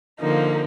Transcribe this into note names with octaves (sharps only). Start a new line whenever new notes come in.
D3 F3 A#3 D#4